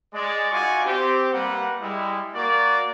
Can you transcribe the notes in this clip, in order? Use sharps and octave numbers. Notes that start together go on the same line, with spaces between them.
G#3 D5
D#4 F4 F#4 D5 G#5 C#6
C4 G4
G3 A#3 B4 F#5
G3 G#3 E4
A#3 F#4 A#4 D5